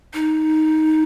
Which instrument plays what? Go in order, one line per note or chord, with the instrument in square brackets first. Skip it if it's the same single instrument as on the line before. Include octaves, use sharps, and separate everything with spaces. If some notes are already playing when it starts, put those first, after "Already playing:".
[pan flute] D#4